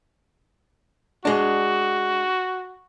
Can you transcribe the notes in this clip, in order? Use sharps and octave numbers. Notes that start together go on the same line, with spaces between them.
G#3 D4 F#4